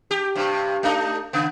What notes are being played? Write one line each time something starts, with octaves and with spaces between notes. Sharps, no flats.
G4
G2 C3
A3 D4 D#4
C#3 B3